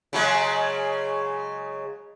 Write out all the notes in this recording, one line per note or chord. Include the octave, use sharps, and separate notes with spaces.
C#3 F#3 G#3